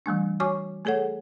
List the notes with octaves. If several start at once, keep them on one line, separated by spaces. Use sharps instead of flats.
E3 G3 A3 D4
F#4 C#5 G#5 C#6 D6
A3 G#4 A4 C#5 F#5